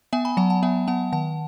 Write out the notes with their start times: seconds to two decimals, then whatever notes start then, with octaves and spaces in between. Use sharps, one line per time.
0.13 B3 E5 G#5
0.25 G#5 B5
0.37 F#3 F#5 A5
0.50 F#5 A5
0.63 B3 E5 G#5
0.88 B3 F#5 A5
1.12 D#3 F#5 A5